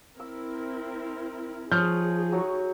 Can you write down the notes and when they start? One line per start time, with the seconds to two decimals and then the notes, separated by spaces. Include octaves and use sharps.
0.20 C4 E4 A#4 E6
1.72 F3 D#4 G#4 C#5 D#6 F6 G6
2.32 F#3 C#6